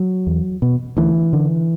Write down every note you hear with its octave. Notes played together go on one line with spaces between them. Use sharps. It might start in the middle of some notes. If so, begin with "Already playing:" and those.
Already playing: F#3
E2
B2
D2 E3
D3